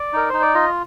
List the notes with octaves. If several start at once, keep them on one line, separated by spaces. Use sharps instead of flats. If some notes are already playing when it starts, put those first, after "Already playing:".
Already playing: D5
D#4 A#4
D#4 C5
D5
F4 D#5